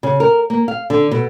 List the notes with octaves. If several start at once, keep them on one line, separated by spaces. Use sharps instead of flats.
C#3
A#4
A#3
F5
D3
B2